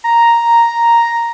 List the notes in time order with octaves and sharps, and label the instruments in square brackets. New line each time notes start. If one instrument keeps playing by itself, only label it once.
[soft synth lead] A#5